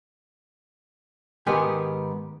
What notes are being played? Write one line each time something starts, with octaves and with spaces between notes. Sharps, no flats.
G#2 D#3 B3 G4 G#4